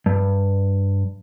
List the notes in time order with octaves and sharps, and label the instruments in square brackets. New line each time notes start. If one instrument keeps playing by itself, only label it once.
[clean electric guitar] G2